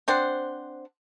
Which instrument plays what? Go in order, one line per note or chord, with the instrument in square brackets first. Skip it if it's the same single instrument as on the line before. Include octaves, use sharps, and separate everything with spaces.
[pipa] C4 D4 C5 F#5